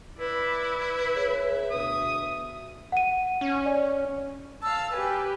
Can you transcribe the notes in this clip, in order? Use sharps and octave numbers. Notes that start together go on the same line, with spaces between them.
E4 B4 D5
G#4 C#5 E5
D2 B2 D#6
F#5 D#7
C#4
D5
F5 A5 E6
G4 B4 G#5